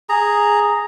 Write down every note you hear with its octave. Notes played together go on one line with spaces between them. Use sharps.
G#4 A#5